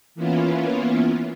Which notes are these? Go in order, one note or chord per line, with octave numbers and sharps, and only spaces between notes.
E3 A#3 B3 C#4 E4 F4